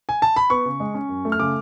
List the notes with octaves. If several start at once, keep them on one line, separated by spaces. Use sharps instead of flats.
G#5
A5
B5
B3 C#6
C#3
G#3
C#4
F#2
A3
F6
C#3 D6